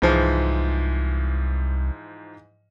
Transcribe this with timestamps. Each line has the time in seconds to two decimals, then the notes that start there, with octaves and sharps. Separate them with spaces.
0.02 C2 G#2 E3 F3